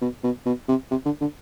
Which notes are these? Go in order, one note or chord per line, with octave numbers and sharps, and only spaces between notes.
B2
B2
B2
C3
C3
D3
D3